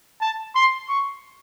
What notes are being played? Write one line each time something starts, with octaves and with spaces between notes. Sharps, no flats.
A5
C6
C#6